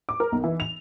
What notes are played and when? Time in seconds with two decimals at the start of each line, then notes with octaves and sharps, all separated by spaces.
0.09 D6
0.20 A#4
0.32 B1
0.44 E3
0.60 F7